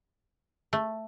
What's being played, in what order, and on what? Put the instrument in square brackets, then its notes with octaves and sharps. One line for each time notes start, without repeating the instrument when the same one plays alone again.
[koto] A3